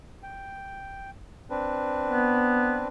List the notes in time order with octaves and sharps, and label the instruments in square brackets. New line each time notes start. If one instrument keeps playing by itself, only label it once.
[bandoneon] G5
C4 D4 B4
[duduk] B3